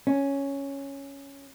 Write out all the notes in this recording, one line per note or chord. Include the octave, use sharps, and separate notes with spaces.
C#4